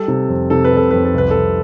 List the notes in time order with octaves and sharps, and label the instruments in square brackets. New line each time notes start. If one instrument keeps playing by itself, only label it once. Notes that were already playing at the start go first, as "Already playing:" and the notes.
Already playing: [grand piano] G3 A4
C3
F2
C3 A4
B4
C3 A4
F2 B4
A4
C2 B4
C2 A4